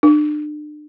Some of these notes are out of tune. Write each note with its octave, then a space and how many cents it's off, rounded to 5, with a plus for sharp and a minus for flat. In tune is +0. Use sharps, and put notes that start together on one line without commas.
D4 +35